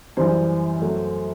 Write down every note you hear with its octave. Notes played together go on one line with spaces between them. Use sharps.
F#2 E3 G3 C5
F#2 F#3 A3